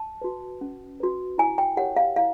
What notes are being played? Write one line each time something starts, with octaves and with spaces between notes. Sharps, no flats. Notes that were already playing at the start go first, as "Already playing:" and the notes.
Already playing: A5
F#4 B4
C#4
F#4 B4
E4 G#5
G5
G4 A#4 C#5 F#5
F5
E4 F5